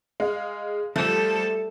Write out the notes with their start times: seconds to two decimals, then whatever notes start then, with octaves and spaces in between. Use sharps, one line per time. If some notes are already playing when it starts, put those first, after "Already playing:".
0.20 G#3 F5
0.96 F3 G3 A3 A4